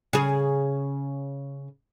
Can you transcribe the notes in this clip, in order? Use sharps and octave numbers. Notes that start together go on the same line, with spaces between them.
C#3 G#4